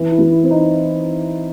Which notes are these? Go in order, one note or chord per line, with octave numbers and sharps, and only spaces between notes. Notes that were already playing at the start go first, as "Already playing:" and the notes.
Already playing: E3
E4
E3
E4
C4
D#4